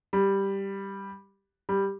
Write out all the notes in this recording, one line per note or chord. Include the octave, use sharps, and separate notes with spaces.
G3
G3